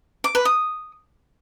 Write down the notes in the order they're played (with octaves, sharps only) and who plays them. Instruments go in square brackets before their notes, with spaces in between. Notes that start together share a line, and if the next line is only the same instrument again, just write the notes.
[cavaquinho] D6
B4
D#6